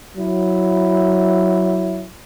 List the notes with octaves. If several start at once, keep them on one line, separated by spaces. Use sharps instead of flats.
F#3 E4